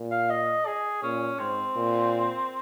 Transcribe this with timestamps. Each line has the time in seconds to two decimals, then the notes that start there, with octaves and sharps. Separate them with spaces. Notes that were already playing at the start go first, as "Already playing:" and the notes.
Already playing: A#2
0.11 F5
0.30 D#5
0.66 G#4
1.02 A#2 C#4
1.39 G#2 C4
1.76 A#2